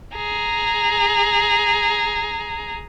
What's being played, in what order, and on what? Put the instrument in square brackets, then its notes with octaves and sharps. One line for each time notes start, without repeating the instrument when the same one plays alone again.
[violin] G#4 A#5